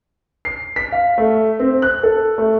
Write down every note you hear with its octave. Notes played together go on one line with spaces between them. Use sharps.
C7
B6
F5
A3
C4
F#6
A4
A3